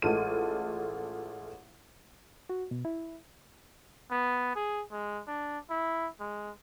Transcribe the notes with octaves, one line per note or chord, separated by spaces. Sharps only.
A1 G#3 A3 F4 A4 D#7
F#4
B2
E4
B3
G#4
G#3
D4
E4
G#3